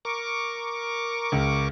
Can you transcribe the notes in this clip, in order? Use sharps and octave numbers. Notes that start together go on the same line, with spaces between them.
A#4 C#6 D6
C#2